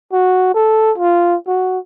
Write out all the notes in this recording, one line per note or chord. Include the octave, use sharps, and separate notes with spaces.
F#4
A4
F4
F#4